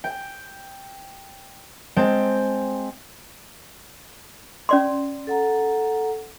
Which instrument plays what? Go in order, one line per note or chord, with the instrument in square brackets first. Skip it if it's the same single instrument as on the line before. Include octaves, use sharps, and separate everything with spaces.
[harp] G5
G#3 C4 G5 A5
[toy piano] C#4 D5 C6
[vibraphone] A4 F#5 A#5